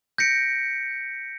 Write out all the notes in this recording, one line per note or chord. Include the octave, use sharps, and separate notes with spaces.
G6 A#6 B6 C#7 D7